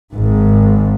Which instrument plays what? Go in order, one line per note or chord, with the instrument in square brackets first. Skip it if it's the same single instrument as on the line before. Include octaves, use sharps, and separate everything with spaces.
[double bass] G#1 G#2